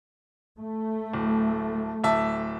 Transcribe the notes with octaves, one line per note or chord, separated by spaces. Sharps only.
A3
D1
D1 E5 A5